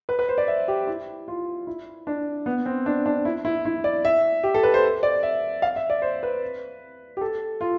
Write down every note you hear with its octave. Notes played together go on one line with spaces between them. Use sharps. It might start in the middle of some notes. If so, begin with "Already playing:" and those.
B4
B4
C5
D5
E5
G4
E4
F4
E4
D4
B3
C4
D4
D4
E4
E4
E4
D5
E5
G4
A4
B4
C5
D5
E5
F5
E5
D5
C5
B4
G4
A4
F4